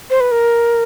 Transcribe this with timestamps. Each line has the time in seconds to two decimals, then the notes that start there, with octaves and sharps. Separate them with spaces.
0.10 C5
0.20 B4
0.31 A#4